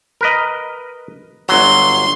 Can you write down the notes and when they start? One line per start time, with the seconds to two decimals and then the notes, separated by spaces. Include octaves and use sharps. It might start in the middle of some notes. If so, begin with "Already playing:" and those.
0.21 A#4 B4 D#5
1.49 G1 F#3 C6